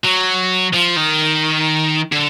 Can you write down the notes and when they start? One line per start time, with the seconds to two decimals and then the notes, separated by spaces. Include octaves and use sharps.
0.05 F#3
0.74 F3
0.97 D#3
2.12 D3